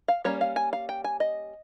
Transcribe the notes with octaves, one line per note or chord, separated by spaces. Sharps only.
F5
G3 A#3 C#4 C#5
F5
G#5
F5
G5
G#5
D#5